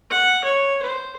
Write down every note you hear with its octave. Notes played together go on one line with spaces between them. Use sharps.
F#5
C#5
C5